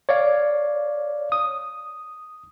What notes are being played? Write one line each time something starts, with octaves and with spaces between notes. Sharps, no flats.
C#5 D5 F5
D#6